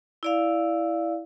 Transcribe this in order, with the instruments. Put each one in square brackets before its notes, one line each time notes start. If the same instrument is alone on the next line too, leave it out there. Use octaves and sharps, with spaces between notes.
[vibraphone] E4 D5 F5